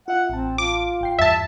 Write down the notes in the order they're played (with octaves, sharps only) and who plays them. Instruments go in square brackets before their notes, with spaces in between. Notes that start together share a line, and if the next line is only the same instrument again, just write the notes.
[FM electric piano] F4 E5 [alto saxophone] F#5
[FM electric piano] A1 A5 [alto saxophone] C4
[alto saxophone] F4 [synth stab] D6
[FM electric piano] G1 G5 C7
[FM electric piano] E2 G2 [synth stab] E5 A5